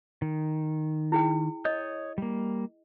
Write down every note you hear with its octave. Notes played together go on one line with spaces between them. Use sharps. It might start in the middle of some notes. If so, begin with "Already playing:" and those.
D#3
E4 G#4 G5
C#5 D#5 D#6 G6
G3 A#3